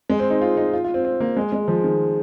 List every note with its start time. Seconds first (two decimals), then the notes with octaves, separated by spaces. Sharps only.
0.10 G#3
0.20 C4
0.30 D#4
0.41 F4
0.57 D#4
0.74 F4
0.84 F4
0.94 C4
1.05 C4
1.20 A#3
1.37 G#3
1.52 G#3
1.68 F3
1.84 D#3